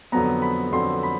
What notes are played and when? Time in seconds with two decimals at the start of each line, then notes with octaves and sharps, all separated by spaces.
0.12 F2 D3 F#3 B3 A#5
0.42 B5
0.72 F2 D3 F#3 B3 C6
1.03 B5